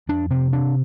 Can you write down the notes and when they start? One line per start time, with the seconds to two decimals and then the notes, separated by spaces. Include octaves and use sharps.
0.09 F2 D4
0.30 C3 C4
0.52 C3 D4